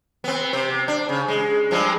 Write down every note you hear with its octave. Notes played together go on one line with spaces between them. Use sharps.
B3 C4
C3 C5
D4
C#3
G#3
G2 F3 G#3